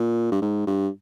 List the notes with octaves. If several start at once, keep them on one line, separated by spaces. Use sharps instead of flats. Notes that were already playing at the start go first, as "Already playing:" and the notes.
Already playing: A#2
G2
G#2
G2